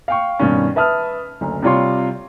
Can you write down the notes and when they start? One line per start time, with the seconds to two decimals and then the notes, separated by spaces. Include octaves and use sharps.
0.08 F5 G5 C#6
0.39 G2 B2 D#3 C#4
0.76 B4 E5 A5 D#6 F6
1.41 F#1 D2
1.62 C3 G3 F4 C#5 C6